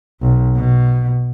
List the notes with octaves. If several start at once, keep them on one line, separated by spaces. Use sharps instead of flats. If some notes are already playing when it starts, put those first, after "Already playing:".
B1
B2